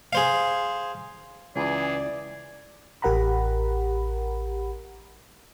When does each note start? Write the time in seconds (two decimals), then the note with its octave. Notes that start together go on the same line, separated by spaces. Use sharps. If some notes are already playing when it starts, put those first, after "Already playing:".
0.13 G#4 C5 F5
1.56 C#2 E3 G#4 D5
3.02 A1 G4 A#4 F#5 A#5 B5